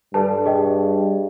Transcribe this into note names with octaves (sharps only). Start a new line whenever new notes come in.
G2 A4 B4 A5
G#4 D#5 G5